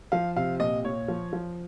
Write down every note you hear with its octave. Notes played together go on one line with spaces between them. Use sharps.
F3 F5
C3 F5
A#2 D#5
A#2 C#5
F3
F3